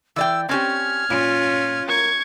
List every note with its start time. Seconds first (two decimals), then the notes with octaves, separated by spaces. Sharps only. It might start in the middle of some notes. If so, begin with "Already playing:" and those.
0.16 E3 D5 G5 E6
0.49 C4 C#4 G4 F6 G#6
1.10 A#2 C#4 F4
1.88 A#4 C#6 G#6